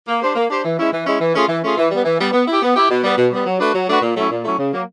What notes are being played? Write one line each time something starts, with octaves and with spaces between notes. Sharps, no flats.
A#3
D4 G4 C5
A#3
D4 G4 C5
E3
G#3 C#4 E4
E3
G#3 C#4 E4
E3
A3 C#4 F4 G#4
E3
A3 C#4 F4 G#4
E3
G3
B3
E3
G3 B3
B3
E4 G4
B3
E4 G4
B2
G3 B3
B2
G3 B3
F#3
A3 D4 F#4 B4
F#3
A3 D4 F#4 B4
A#2
F#3 A3 C#4 E4
A#2
F#3 A3 C#4 E4
C#3
F#3 A#3